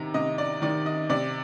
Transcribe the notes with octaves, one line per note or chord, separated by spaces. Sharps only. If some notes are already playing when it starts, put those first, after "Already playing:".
Already playing: C3 D#3 A#5
C3 D#5
D5
D#3 D5
D#5
C3 D5